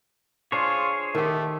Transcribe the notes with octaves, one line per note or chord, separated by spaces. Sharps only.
D4 F4 G#4 C5 C#5
D#3 A3 G4